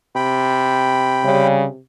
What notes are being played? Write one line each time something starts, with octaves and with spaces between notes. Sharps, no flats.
C3 G5 B5
C#3 G3